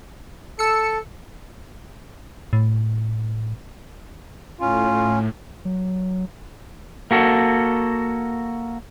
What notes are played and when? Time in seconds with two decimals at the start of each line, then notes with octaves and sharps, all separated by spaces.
0.59 A4 E6 C#7
2.53 A2
4.61 A2 C#4 F4
5.65 F#3
7.11 A#3 F#4 A4